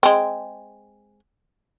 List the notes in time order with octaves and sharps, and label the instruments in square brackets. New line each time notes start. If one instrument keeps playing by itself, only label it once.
[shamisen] G#3 C4